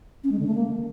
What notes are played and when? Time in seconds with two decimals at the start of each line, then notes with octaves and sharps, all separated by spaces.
0.24 C#4
0.32 G#3
0.39 D3
0.47 A3
0.55 A#3